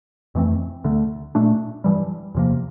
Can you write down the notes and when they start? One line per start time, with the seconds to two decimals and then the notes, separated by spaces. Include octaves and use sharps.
0.35 F2 E3 A3 C4
0.84 D2 D3 A3
1.35 A#2 A3 D4
1.84 G2 E3 G3
2.35 E2 C3 F3 A#3